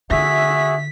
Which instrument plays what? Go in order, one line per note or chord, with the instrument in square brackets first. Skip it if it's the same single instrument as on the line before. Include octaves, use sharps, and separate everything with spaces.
[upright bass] D3 [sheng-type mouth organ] F#4 G#4 [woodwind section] E5 [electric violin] B6